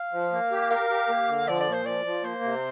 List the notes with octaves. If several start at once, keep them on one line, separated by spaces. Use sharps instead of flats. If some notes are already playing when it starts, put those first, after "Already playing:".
Already playing: F5
F3
A#3
G4
A#4 F5
G4
A#3
D3
F3 D5
D5
A#2
C5
F3 D5
F3
A#3 C5
C3